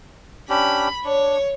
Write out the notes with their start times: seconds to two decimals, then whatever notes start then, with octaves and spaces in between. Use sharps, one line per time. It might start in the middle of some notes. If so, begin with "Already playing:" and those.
0.50 C#4 D4 G4 B5
1.05 D4 C#5